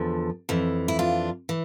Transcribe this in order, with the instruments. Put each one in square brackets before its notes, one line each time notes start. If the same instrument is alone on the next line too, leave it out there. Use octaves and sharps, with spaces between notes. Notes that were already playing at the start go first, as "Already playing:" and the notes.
Already playing: [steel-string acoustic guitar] E2 D3 F3
F2 E3
E4
D4 F4
E3